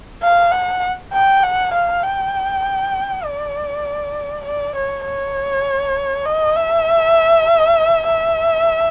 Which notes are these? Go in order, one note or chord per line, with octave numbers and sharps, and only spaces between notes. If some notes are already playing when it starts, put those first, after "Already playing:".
F5
F#5
G5
F#5
F5
G5
D5
D5
C#5
C#5
D#5
E5
E5